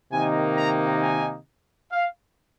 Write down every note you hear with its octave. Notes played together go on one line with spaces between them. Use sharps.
C3 D#3 A#3 D#4 G#5
A#5
G#5
F5